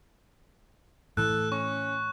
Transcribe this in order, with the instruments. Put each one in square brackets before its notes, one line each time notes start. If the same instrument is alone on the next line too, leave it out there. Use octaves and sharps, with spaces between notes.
[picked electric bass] A2 E3 [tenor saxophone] A4 [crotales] F#6
[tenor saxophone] C#4 [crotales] C#6